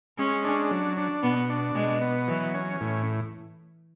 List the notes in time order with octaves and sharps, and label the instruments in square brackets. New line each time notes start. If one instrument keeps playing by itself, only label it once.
[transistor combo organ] G#3 [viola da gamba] C#4
[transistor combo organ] D4
F#3
D4
[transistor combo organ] B2 [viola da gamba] B3
[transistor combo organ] D4
[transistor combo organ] B2 [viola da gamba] G#3
[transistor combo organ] B3
[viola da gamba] E3 [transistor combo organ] F#3
[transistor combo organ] C#4
A2